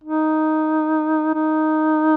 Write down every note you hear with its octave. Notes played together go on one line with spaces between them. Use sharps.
D#4
D#4